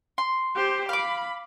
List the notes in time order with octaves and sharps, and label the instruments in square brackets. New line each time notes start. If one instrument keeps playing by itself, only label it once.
[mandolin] C6
[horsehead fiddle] G4 C5
[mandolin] F5 D6 [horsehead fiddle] B5